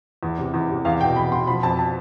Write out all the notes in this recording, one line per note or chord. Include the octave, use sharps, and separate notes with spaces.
E2
C3
E2
C3
E2 F5
B2 G5
E2 B5
B2 C6
F3 B5
F2 A5
A5